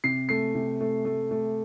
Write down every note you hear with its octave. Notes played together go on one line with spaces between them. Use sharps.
C3 C7
A3 C7
C3
A3
A3
A3